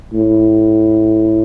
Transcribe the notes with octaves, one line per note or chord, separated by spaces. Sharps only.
A2